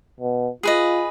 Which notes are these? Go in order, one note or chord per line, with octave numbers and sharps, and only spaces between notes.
B2
F4 G#4 B4 D#5